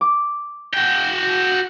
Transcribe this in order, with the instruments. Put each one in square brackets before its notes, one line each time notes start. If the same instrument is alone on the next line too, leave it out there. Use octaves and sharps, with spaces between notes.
[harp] D6
[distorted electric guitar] F#4 G5